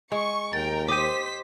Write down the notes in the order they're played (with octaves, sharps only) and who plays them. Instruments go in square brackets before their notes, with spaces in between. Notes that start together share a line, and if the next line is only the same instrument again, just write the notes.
[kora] G#3 [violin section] C#6
[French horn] D#2 [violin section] A#4 G5 [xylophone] A6
[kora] G4 D#5 [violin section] C5 B6 [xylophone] D6 D#7